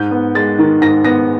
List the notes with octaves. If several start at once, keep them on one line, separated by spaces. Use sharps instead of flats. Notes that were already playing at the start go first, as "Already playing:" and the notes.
Already playing: G#2 G6
B3
G#3 A6
D#3
G#2 A#6
B3 A#6